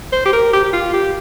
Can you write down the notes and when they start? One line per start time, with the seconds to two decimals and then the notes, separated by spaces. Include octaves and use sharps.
0.13 C5
0.25 G4
0.33 A#4
0.53 G4
0.64 G4
0.73 F4
0.93 G4